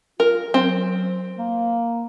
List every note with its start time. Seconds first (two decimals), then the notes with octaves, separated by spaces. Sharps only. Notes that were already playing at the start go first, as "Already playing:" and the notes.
0.20 F4 A#4
0.54 F#3 C4
1.38 A#3